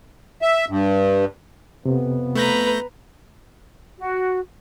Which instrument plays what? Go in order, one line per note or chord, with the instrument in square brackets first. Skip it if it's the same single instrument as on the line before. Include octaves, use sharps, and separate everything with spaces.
[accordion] E5
G2
[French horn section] F2 B3 [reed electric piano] C3
[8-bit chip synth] A3 G6 A#6 [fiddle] B4 A#5
[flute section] F#4